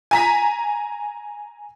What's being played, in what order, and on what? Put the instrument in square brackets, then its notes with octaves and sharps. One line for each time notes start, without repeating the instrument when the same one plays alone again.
[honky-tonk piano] G#5 A#5 B6